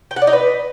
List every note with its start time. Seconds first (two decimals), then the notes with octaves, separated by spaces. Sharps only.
0.11 G5
0.16 F#5
0.22 D5
0.27 D#4
0.33 B4